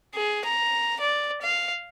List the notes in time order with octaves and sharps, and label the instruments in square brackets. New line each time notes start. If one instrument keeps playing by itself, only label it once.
[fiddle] G#4
A#5
D5
F5